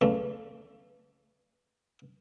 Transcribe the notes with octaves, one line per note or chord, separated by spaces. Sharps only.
E2 C#3 A3